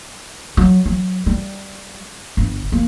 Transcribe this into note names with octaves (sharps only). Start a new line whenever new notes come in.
F#3
F#3
G3
G1
A#3